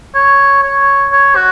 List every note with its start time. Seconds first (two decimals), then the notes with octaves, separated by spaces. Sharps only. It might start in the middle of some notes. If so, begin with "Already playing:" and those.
0.15 C#5
0.63 C#5
1.12 C#5
1.36 F#4